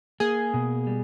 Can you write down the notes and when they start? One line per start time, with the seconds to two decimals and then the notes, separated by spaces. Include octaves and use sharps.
0.20 A#3 G#4
0.54 B2
0.87 G3